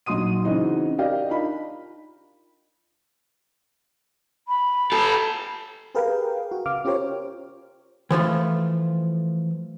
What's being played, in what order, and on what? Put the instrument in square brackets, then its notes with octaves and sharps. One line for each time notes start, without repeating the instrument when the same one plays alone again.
[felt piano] A#1 F#3 D#4 C6 D#6 D#7
C#3 E3 C4 D#4 F#4
G4 A#4 D5 D#5 F5 G5
D4 D#4 F4 B5
[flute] B5
[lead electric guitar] G4 A4
[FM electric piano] G4 G#4 A#4 B4 F5 G5
F#4
C#3 F5 D6 F6
C#4 F4 G4 A#4 C5 C#5
[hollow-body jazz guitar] E3 F3 A3 F4